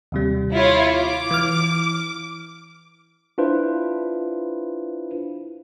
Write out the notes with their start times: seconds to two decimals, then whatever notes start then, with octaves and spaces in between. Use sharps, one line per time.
0.12 D#2 C3 G3
0.52 E4 F4 C#5
0.95 D6
1.31 E3 F6
3.38 D4 E4 F4 B4 C5